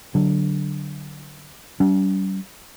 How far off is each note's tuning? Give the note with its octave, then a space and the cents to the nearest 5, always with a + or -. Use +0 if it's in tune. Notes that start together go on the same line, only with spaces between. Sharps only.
D3 +0 F#3 +25
G3 -40 C#4 +45